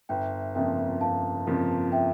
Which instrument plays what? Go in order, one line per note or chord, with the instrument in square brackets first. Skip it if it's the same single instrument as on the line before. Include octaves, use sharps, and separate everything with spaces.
[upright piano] G1 [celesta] E5 G5
[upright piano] F2 C#3 F3 A#3 [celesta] E5 G5
[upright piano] G1 [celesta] F5 A5
[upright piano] F2 C#3 F3 A#3
[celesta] E5 G5